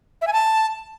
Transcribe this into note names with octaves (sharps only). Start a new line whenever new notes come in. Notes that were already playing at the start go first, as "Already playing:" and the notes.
E5
G#5
A5